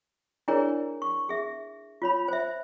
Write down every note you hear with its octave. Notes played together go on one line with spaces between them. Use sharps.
D4 E4 G#4 A#4 C#5 D5
C#6
G#4 E5
F4 C#5 B5
C5 E5